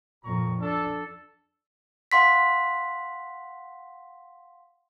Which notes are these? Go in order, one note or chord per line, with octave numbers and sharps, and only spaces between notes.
F2 A#2 A#5 C#6
D4 A4
F5 F#5 C6 B6